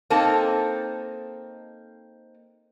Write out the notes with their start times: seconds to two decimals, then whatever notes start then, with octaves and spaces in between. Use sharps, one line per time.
0.10 A#3 C4 D#4 A4 A5